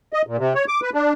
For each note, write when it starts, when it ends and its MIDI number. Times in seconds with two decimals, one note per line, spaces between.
0.13 0.22 75
0.27 0.37 46
0.38 0.53 48
0.55 0.65 73
0.68 0.80 86
0.82 0.90 71
0.94 1.13 62